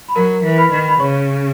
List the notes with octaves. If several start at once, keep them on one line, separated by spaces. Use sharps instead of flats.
B5
F#3 A#4 A#5
E3
B4 B5
D#3
B5
C#3 C#5 C#6